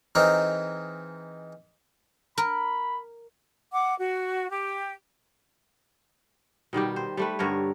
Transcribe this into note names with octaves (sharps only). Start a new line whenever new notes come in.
E3 G#3 C4 D#4 A#4
A#4 B5
F#5 D6
F#4
G4
B2 D#3 G3 G4
C5
G3 A3 B4
G2 D3 A#4 C#5